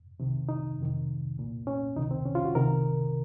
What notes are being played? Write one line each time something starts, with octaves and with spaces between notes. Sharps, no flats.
C2 C3 D#3
D#4
F2 C3 D#3
C2 A#2
C#4
C#2 C3 D#3 D#4
C4
C#4
F4
F#4
C2 C3 D#3 A#4